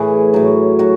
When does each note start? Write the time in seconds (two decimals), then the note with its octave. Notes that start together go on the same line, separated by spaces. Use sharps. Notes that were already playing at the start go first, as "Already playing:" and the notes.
Already playing: A2 E3 G#4 B4
0.34 A2 F#3
0.79 F#3 F#4